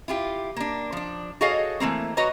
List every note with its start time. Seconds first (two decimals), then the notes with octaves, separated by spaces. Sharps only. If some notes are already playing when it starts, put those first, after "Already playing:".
0.08 E4 F4 G4
0.56 A#3 D4
0.92 F3 D4
1.41 F#4 G#4 A4 C#5 D#5 F5
1.80 E3 A3 A#3 C4
2.17 F#4 B4 C#5 D#5 A#5